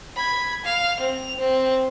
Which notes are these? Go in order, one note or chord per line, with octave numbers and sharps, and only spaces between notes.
B5 G#6
F5
C4 F7
C4